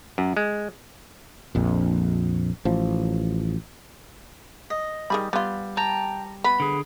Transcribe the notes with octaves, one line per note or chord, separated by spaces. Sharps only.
F#2
G#3
A#1 F2
A1 F3
D#5
D#3 G3 G#4 B5
G3 B3 F4
G5 A5 A#5
B3 B5
D3 G#4